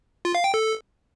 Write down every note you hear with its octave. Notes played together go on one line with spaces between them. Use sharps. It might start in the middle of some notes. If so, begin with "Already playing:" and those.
F4
F5
G5
A4